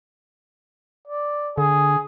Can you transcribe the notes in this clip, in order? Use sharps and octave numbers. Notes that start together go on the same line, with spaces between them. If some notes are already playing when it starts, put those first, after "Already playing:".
D5
D3 G#4